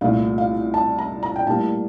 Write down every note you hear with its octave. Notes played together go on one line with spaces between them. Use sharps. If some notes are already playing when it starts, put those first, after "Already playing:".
C2 A#2 A3 F5
F5
A5
A#5
A#5
G5
A2 G3 A#3 A5